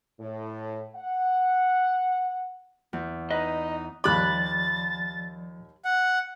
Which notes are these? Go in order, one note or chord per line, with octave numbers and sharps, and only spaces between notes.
A2
F#5
E2
D#4 B4 D#5
D#2 F3 G3 D5 B5 D6 F#6 A6
F#5